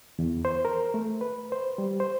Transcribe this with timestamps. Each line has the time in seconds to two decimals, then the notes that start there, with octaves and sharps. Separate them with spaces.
0.19 E2
0.45 C5
0.65 A#4
0.94 A3
1.21 B4
1.52 C5
1.78 G3
2.00 C5